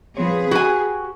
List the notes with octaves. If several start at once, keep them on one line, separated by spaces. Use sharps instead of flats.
F3 C4 G#4 B4 C#5
F#4 G4 G#5